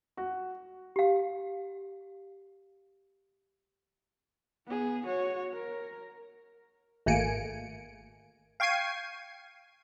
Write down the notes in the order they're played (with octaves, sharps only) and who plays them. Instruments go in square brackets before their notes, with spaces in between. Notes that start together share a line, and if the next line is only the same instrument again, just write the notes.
[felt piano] F#4
[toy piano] G4 F5
[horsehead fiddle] B3 G#4
F#4 C#5
A#4
[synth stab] G#1 A3 A#3 G#5 C#7 D7
F5 G5 C#6 G#6 C7 D#7